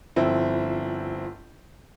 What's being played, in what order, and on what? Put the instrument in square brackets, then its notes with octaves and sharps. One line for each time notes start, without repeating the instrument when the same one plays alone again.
[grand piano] G1 F3 C4 E4